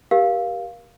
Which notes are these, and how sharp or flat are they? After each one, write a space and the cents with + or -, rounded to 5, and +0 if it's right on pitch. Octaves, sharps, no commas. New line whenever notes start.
G4 +0 A#4 +30 F5 +0